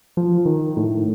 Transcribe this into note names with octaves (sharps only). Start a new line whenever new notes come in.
F3
D#3
A2